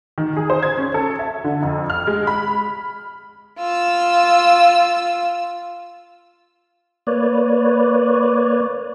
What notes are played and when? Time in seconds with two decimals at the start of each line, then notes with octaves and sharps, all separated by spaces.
0.18 D#3
0.37 G#4
0.50 C5
0.63 G#6
0.78 C#4
0.94 A4
1.19 E5
1.44 D3
1.63 F2
1.90 F6
2.07 G#3
2.27 B5
3.59 F4 E6
7.07 A#3 B4 C#5 D5